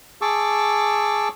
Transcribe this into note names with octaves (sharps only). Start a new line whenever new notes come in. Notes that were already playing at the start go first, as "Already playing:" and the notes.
G#4 A5 C#6 D6 E6